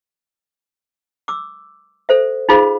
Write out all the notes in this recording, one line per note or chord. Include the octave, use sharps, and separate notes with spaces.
D6 E6
A4 C5 E5
D#4 F4 G#4 C5 F5 B5